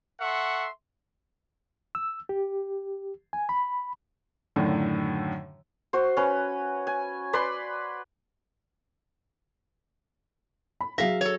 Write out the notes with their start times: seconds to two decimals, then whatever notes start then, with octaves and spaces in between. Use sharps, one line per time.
0.21 A4 E5 F#5 C6 C#6
1.95 E6
2.29 G4
3.33 G#5
3.49 B5
4.56 F#2 A2 D3 D#3
5.93 F#4 C5
6.17 C#4 B4
6.87 G#5
7.33 B4 D5 B5 C6
10.81 B5
10.98 F#3 G#4 E5 F5 A#6
11.21 A4 C#5